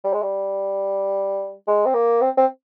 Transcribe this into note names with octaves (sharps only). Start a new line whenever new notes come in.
G3
G#3
G3
G#3
C4
A#3
C4
C4